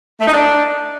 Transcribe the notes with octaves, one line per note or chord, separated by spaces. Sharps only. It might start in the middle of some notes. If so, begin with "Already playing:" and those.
A3
D#4
D4